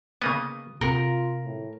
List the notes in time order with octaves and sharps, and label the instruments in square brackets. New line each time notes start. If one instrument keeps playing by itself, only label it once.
[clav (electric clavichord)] C#3 A#3 B3 [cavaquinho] D#6
[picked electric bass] C3 [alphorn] F4 [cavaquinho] A#4 [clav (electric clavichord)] F#5 G5
[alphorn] A2